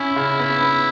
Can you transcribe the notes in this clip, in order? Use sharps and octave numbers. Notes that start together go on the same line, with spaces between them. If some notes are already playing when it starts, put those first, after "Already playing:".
Already playing: C#4 E4
C#3
B3
B3